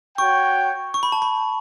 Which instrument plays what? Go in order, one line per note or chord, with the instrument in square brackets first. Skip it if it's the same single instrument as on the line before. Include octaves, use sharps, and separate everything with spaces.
[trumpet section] F#4 C#5 G5 [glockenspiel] C#6
[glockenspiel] C#6
B5
A5
B5